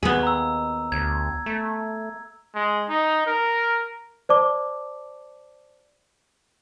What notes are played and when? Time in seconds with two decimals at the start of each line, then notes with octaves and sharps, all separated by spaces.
0.03 D#2 B3 G#4
0.23 A#5 E6
0.92 D2 G#6
1.46 A3
2.55 G#3
2.89 D#4
3.26 A#4
4.29 C5 D5 A5 D6